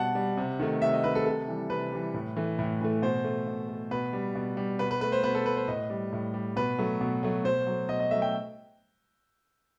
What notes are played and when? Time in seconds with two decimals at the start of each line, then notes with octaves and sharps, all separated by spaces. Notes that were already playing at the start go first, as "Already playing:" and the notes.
Already playing: B2 G3 F#5 A5
0.15 G3
0.37 C3
0.59 D#3 A3
0.82 C3 E5
0.93 D#5
1.04 D#3 A3 B4
1.15 A4
1.26 C3 A4
1.48 E3 G3
1.70 C3 B4
1.92 E3 G3
2.14 A2
2.36 E3 A3
2.59 A2
2.81 E3 A3
3.02 B2 C5
3.24 A3
3.47 B2
3.69 A3
3.91 B2 B4
4.13 G3
4.35 B2
4.57 G3
4.79 B2 B4
4.91 B4
5.01 A3 B4
5.12 C5
5.23 B2 B4
5.35 A4
5.46 A3 B4
5.56 C5
5.68 A2 D#5
5.90 G3
6.12 A2
6.34 G3
6.56 B2 B4
6.78 F#3 A3
7.01 B2
7.23 F#3 A3
7.44 B2 C5
7.67 F#3 A3
7.89 B2 D#5
8.00 D#5
8.11 F#3 A3 E5
8.22 G5